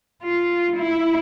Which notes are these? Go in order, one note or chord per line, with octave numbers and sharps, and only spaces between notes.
F4
E4